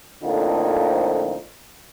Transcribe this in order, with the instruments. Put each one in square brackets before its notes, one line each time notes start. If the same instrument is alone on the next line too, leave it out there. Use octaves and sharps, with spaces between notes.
[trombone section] F2 A2 D3 F3 A#3 D#4